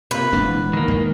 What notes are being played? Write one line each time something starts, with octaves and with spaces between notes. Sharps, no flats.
C3 A#3 F4 B4
D#1 E3 G#3 B3 D4
D#3 A#3
D#2 G#3